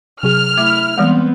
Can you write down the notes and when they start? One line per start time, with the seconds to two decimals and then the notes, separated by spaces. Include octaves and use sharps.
0.23 C3 F#3 G#4 F6
0.57 A3 E4 E5 D6
0.98 E3 G3 G#3 B3 C4